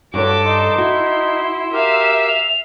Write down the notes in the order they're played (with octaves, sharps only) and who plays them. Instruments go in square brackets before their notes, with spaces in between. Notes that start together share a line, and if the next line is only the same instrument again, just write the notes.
[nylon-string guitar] G2 C#5 [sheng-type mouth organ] F#4 [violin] A4 D6
[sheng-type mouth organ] D#4 [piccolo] C6
[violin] E4 [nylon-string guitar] F#4
[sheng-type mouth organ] G4 A#4 [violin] E5 F5
[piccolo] F7